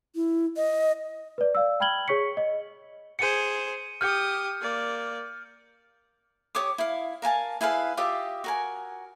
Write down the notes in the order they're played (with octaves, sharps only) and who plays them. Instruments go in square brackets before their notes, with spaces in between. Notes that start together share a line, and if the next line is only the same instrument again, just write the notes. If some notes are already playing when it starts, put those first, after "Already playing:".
[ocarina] E4
D#5
[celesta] B4 D5
D5 F5 E6
G5 B5 F6 G#6 F#7 G7
G#4 C#5 C#6 B6 C#7
D#5
[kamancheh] G#4 C5 [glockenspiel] C#7 D#7
[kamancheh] G4 D#6 [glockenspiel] F6 G6 C#7
[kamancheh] A#3 D5
[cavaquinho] G4 C#5 D6 D#6
E4 F5
A#4 F5 G#5 A5
E4 G#4 B4 F5
F4 G4 D#5 E5
F#4 A#4 G#5